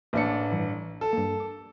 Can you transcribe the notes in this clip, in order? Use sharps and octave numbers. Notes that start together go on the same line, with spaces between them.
A1 A#3 D4 C#7
G2 E3
A4
G2 A#3
D6